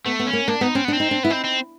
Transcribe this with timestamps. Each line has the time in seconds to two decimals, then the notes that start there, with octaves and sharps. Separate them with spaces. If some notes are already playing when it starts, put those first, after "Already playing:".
0.06 A3 B3
0.19 B3
0.27 C#4
0.33 A#3
0.48 A#3 D4
0.61 B3 D#4
0.75 C4 C#4
0.85 B3
0.88 D4
0.93 C4
1.00 D#4
1.11 D4
1.23 B3 E4
1.30 C4 D#4
1.44 C4